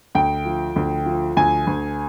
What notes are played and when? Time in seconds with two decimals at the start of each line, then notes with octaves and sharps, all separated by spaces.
0.15 D2 G5
0.45 F3
0.76 D2
1.06 F3
1.37 D2 G#5
1.67 D2